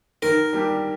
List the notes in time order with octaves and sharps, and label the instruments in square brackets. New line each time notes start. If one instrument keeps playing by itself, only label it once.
[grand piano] D#3 [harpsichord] A#4
[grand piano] G3 A#3 D4 G4